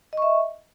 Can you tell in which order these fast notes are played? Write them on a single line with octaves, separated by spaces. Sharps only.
D#5 C#6 E5